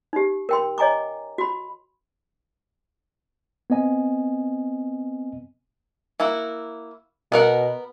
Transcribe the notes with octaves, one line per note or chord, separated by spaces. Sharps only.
D#4 G4
A#4 G5 C6
C#5 D#5 G#5 A#5 D6
F#4 B5
B3 C4 D#5 G#5
A#3 E4 F#4
B2 B3 A#4 F#5